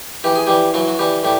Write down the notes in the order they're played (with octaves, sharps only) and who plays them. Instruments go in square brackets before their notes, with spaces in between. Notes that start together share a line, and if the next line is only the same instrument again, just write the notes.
[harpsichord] E3 G4
G#4
E3 G3 G4
E3 F#3 F#4
F#4
E3 G3 G4
A2 G3 G4